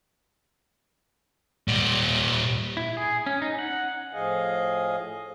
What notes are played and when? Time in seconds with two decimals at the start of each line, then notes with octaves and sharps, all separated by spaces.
1.68 A#2 G3
2.77 E4
2.97 G#4
3.26 C#4
3.42 D#4
3.59 F#5
4.14 A2 F3 G#4 D#5 F5 G#5